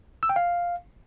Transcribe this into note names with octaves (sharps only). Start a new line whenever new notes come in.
E6
G5
F5